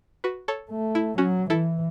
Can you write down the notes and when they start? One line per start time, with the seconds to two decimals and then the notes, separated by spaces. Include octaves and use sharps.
0.24 F#4 B4
0.48 A4 C#5
0.71 A3
0.95 E4
1.18 F#3 C#4 F#4
1.50 E3 E4 A4